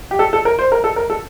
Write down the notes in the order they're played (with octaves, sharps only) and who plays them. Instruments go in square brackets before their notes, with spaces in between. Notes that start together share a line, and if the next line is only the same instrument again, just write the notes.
[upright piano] G4
A4
A4
A#4
C5
A#4
A4
A#4
A4